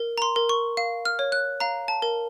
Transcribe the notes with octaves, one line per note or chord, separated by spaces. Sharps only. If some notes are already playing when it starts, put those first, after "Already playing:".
Already playing: A#4
A#5
C6
A#4
C#6
F5
F6
C#5
F#6
F5 A#5
A5
A#4